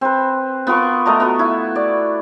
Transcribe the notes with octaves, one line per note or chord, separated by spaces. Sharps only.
C4 B4
B3 F4 A#4 C#6
A3 A#4 D#5 A#5
B3 F#4
E4
D5